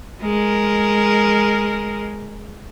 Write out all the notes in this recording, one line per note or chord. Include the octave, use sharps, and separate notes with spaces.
G#3 A#4